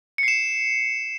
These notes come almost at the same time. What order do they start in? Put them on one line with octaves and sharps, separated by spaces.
C#7 C7 E7